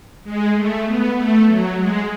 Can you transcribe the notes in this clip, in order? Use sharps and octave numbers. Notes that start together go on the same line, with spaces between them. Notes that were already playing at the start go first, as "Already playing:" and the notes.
G#3
A3
B3
A3
F#3
G#3